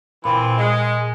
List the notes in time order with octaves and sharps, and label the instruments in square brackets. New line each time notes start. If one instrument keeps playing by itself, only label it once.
[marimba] A#2 B5 [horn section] E3 C4 F4
[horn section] G#3